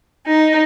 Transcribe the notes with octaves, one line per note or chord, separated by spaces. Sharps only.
D#4